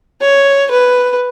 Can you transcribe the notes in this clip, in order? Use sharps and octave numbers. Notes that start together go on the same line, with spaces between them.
C#5
B4